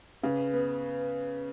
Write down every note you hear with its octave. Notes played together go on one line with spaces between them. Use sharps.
C#3 B4
B3